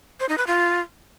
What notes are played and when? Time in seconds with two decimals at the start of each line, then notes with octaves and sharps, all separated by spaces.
0.20 C5
0.29 D#4
0.38 B4
0.47 F4